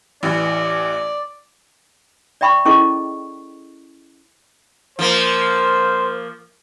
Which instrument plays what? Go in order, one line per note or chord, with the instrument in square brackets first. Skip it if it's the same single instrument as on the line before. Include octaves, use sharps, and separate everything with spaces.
[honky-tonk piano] A1 E3 [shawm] D5
[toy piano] D5 E5 G5 B5 C#6
C#4 E4 G#4 A4 D#5 C#6
[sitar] F3 A#3 [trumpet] C5